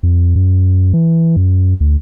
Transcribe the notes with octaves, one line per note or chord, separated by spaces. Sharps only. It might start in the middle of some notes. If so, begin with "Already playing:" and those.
F2
F#2
E3
F#2
D2